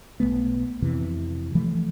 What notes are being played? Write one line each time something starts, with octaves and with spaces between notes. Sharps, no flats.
B1 G#2 A3 B3
F2 C3 E3
E3 F3 A3